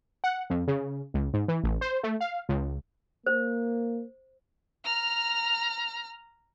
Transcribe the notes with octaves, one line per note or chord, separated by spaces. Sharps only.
F#5
F2
C#3
C#2
G#2
E3
A1
C5
A3
F5
C#2
A#3 C5
A#5 F6